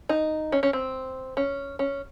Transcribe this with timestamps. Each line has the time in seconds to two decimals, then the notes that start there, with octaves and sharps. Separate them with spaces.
0.09 D#4
0.52 C#4
0.63 C#4
0.73 C4
1.37 C#4
1.79 C#4